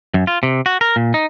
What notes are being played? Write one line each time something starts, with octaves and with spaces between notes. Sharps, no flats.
F#2
F4
C3
F#4
A#4
A#2
D#4